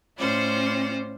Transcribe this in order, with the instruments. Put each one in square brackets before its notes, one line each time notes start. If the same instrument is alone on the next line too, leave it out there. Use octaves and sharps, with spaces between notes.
[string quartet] A2 C#4 F4 C5 D5